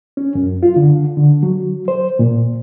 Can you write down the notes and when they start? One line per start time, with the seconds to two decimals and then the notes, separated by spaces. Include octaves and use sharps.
0.17 C#4
0.35 F#2
0.63 F4
0.76 D3
1.17 D3
1.43 F#3
1.88 C5
2.19 A#2